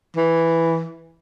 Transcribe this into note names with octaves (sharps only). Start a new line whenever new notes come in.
E3